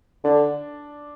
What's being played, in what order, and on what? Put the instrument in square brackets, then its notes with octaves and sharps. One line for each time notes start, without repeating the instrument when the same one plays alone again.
[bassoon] D3 [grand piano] D4